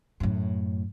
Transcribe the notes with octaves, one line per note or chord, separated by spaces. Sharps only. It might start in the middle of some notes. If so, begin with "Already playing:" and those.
F#2 A2